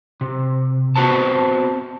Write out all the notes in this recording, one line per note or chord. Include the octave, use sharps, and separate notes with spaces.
C3
B3 C4 F#4 B4 C5 A5